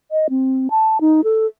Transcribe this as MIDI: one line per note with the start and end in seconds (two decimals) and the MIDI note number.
0.11 0.27 75
0.30 0.68 60
0.70 0.98 81
1.01 1.21 63
1.24 1.46 69